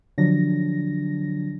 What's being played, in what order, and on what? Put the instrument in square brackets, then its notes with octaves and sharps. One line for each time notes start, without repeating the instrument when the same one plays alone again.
[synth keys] D3 F3 F#3 D4 A#6